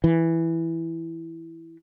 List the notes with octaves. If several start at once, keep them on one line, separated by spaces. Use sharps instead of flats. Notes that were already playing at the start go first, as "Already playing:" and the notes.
E3